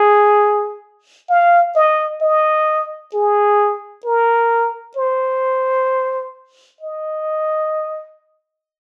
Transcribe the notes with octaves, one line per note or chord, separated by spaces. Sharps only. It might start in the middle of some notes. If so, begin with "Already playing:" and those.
Already playing: G#4
F5
D#5
D#5
G#4
A#4
C5
D#5